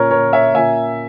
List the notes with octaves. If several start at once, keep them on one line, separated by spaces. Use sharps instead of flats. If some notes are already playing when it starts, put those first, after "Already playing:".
Already playing: A#2 A#3 C#4 A#4 C#5
A#4 C#5
C#5 E5
A#2 A#3 C#4 E5 G#5